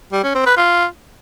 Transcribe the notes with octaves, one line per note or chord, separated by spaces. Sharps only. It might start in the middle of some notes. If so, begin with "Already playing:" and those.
G3
C#4
C4
B4
F4